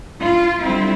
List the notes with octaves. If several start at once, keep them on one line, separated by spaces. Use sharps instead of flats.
F4
D3 G3 C4 E4